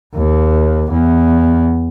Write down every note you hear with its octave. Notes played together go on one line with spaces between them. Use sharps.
D#2
E2